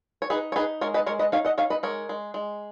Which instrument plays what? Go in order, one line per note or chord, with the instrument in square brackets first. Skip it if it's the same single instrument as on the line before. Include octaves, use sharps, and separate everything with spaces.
[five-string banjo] C#5
D#4 G#4 B4
C#5
D#4 G#4 B4
G#3 A#4 C#5
B4 D#5
G#3 A#4 C#5
B4 D#5
D#4 C#5 F5
D#5 F#5
D#4 C#5 F5
B4 D#5
G#3 A#4 C#5
G#3
G#3